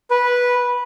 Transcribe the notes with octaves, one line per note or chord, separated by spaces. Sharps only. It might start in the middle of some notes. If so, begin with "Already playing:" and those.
B4